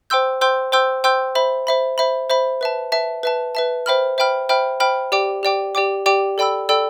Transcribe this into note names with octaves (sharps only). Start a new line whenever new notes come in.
C5 G5 C6 E6 G6
C5 G5 C6 E6 G6
C5 G5 C6 E6 G6
C5 G5 C6 E6 G6
C5 E5 B5
C5 E5 B5
C5 E5 B5
C5 E5 B5
B4 E5 A5
B4 E5 A5
B4 E5 A5
B4 E5 A5
C5 E5 G5 B5 F6
C5 E5 G5 B5 F6
C5 E5 G5 B5 F6
C5 E5 G5 B5 F6
G4 D5 G5 D6
G4 D5 G5 D6
G4 D5 G5 D6
G4 D5 G5 D6
A4 D5 G5 B5 E6
A4 D5 G5 B5 E6